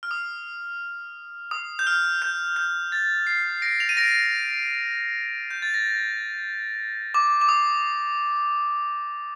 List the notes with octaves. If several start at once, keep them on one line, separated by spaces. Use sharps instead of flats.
F6
D#6
D#6
G6
F6
G6
G6
A6
C7
A#6 D7
F7
D#7
A#6 D7
G6
A6
A#6
D6
D6
D#6